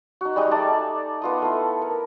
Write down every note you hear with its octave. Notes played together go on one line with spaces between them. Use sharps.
D#4 F#4
G3 G#3 D#4 D#6
A3 D#4 D5 A5
B3 F4 D#6
A3 E4
A#4